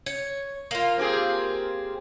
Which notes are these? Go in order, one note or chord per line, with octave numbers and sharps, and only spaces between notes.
C#5
A#3 F4
C4 G4 G#4